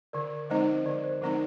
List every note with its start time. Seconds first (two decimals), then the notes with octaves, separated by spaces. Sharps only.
0.13 D3 A#4 D5
0.50 F3 G#3 C4 D#4 C5 D#5
0.85 D3 A#4 D5
1.04 C5
1.22 F3 G#3 C4 D#4 A#4